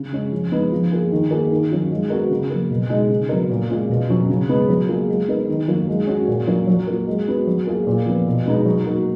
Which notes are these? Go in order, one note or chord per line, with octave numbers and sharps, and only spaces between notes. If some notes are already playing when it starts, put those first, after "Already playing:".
Already playing: C#3
G#3 C#4
F3
G#3 B3 D#4
F3
A#3 F4 G#4
D#3
A#3 F4 G#4
D#3
F#3 C#4 F4
G#3
B3 F#4 A#4
C#3
F#3 A#3
B2
G#3 D#4 G#4
C#3
F#3 B3 F#4 A#4
A#2
G#3 C#4 F4
B2
F#3 C#4 F4
C#3
G#3 B3
F#3
A#3 F4 G#4
G#3
B3 D#4 A#4
D#3
F#3 A#3 F4
G#3
C#4 F#4
A#2
F#3 C#4 F4 A#4
F#3
A#3 F4
G#3
B3 F#4
F#3
A#3 F4 G#4
A#2
F3 B3
B2
G#3 B3 D#4
F#3
A#3 D#4 F#4